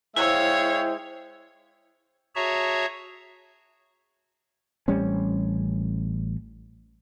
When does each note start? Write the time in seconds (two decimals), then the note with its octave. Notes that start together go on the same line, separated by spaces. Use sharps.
0.16 G#3 E4 C5 C#5 E5 F5 G5
2.35 F#4 G#4 C#5 E5 A5 A#5
4.88 A1 G3 C4 C#4